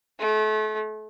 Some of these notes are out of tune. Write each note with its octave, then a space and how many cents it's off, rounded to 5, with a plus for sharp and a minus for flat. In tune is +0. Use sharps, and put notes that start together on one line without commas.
A3 -35